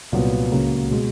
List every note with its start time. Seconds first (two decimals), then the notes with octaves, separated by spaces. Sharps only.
0.12 C2 A#2 F#3 B3
0.51 C#2 C#3 F#3 A#3
0.91 B2 G#3